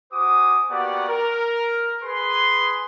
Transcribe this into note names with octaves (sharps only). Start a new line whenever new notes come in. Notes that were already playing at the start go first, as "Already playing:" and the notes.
F#4 C5 G#5 D6 D#6
A#3 B3 F#4 G4 D5 F#5
A#4
G#4 B4 C6